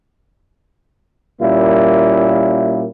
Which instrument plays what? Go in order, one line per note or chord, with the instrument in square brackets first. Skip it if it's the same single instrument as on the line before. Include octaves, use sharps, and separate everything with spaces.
[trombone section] A#2 G3 A#3 C#4 E4